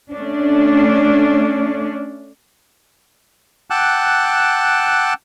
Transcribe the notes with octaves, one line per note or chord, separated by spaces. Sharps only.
A3 C#4 D4
F#5 G5 A5 D6 E6 F#6